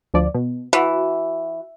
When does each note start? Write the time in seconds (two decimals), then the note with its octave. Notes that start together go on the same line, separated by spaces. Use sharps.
0.14 D2 F3 D5
0.34 B2
0.73 E3 F#4